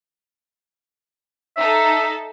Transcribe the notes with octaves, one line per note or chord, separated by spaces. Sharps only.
D#4 A4 E5